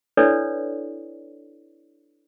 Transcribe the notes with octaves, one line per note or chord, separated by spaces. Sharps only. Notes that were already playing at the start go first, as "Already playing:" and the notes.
D4 E4 A4 B4 C#5 D5